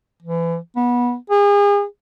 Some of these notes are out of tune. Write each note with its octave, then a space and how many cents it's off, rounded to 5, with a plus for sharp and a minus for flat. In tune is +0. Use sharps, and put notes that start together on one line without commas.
E3 +30
B3 -20
G#4 -40